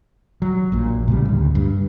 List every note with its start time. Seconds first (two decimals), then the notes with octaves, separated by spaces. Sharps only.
0.42 F#3
0.72 A#1 A#2
1.08 A2 C#3 G3
1.29 D2
1.55 G2